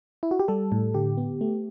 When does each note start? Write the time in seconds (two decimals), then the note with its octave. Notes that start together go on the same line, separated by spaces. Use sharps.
0.23 E4
0.31 F#4
0.40 G4
0.48 G3 A4
0.72 A2
0.94 D3 G4
1.17 B3
1.41 A3